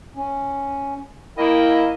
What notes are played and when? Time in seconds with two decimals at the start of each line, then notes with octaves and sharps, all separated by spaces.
0.16 C#4
1.38 A#3 E4 A#4 D#5 G5